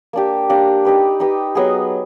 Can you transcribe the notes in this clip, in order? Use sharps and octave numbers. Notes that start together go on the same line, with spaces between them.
A#3 D4 G4
A#3 D4 G4
D#4 G4 B4
D#4 G4 B4
F#3 B3 D#4 G#4